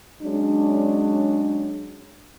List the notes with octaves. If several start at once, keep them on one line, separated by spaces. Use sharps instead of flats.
F#3 G#3 C#4 D4